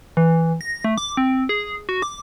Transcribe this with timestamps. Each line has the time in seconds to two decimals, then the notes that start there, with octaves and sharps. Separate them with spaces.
0.17 E3
0.61 A#6
0.84 A3
0.98 D6
1.17 C4
1.49 G#4
1.89 F#4
2.02 D6